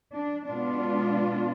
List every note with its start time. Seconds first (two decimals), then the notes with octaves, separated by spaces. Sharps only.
0.16 D4
0.48 B2 G#3 B3 D4 F4